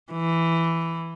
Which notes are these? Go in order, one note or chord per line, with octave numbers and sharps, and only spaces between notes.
E3